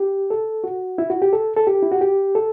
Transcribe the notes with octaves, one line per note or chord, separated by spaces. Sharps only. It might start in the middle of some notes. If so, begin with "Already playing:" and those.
Already playing: G4
A4
F#4
E4
F#4
G4
A4
A4
G4
E4
F#4
G4
A4